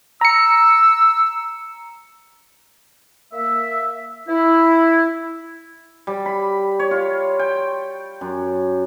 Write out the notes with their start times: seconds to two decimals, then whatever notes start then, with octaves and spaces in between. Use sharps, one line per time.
0.21 A#5 E6 C#7
3.33 A#3 E5
4.28 E4
6.07 G3
6.26 B5
6.79 C#5
6.91 F4
7.39 G5
8.21 F#2